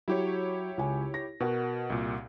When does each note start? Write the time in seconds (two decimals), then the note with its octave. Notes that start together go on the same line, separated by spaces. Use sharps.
0.08 F#3 E4 G4 C#5
0.77 C#2 G#5
1.14 A#6
1.40 B2 F#4 A#4 F#5
1.90 C2 A#2